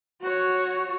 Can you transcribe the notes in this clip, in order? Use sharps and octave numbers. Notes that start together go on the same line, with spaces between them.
F#4 C#5